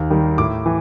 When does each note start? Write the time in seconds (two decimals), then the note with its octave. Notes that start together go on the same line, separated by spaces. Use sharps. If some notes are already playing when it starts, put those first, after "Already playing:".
Already playing: D#2
0.10 D#3 G3
0.38 A2 D6
0.66 E3